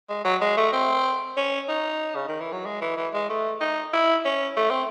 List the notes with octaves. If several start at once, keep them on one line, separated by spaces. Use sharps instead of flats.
G#3
F#3
G#3
A3
C4
C#4
D#4
C#3
D#3
E3
F#3
G#3
E3
E3
G#3
A3
D#4
E4
C#4
A3
C4